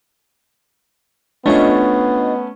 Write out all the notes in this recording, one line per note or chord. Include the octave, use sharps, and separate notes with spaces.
A3 B3 C#4 D4 F4 D#5